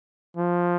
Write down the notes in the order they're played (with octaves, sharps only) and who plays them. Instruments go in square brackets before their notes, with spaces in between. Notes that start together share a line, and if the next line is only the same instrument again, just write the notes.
[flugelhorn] F3